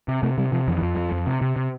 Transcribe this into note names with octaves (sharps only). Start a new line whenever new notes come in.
C3
C3 A3
C3 G3
C3 F3
F2 E3
E3
F2 F3
F2
F2
C3
C3
C3